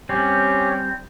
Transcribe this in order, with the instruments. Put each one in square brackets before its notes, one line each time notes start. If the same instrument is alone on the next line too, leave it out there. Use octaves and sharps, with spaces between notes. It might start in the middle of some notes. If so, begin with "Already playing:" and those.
[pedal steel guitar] G3 C4 [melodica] C#4 G4 C#5